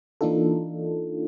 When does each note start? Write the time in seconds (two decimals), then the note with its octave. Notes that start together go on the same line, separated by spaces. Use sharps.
0.21 E3 A#3 D4 D#4 F4 A4